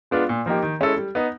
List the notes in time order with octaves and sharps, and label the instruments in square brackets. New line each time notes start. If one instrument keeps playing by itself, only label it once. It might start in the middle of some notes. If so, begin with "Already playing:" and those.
[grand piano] G#3 B3 D4 F4
A#2
F3 A#3 D#4 G4
D#3
G#3 C#4 E4 A4
G3
B3 D#4